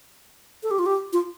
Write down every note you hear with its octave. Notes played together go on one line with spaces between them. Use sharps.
A4
G4
F4
G4
F4